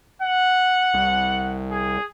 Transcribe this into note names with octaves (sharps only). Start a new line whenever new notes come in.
F#5
C2
G#4